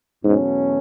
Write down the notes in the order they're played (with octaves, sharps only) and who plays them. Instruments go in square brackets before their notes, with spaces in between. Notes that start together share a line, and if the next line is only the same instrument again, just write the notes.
[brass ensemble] E2 B2 F#3 A3 C#4 [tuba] G#2